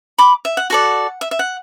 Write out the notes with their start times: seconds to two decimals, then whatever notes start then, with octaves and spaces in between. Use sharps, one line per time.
0.18 B5 D6
0.45 E5
0.57 F#5
0.70 F#4 A4 D5 F#5
1.21 E5
1.31 E5
1.39 F#5